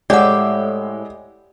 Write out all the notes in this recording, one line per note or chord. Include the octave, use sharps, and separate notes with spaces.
A2 G#3 G4 D5 E5 F#5